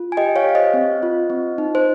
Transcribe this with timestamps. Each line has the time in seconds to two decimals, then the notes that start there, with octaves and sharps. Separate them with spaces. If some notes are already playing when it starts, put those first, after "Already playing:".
Already playing: F4
0.12 G#5
0.17 G4 D#5 G5
0.36 C#5 F5
0.46 G4 F5
0.55 C5 D#5
0.74 C4
1.03 F4
1.30 C4
1.58 D#4
1.75 C5